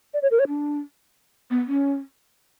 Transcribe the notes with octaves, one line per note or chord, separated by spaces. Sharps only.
D5
C#5
A#4
C#5
D4
B3
C#4